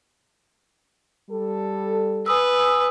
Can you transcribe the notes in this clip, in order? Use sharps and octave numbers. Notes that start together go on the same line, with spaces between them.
G3 A4
B4 G#5 D#6 E6